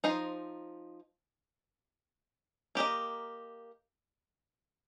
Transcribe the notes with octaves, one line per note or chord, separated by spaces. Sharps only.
F3 D#4 C5 D#5
A#3 G4 A#4 D#5